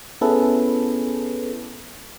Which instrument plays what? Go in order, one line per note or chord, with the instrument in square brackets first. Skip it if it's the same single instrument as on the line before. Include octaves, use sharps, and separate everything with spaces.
[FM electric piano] B3 C#4 E4 G#4 A4 B4